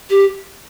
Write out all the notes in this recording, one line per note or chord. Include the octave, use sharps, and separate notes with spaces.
G4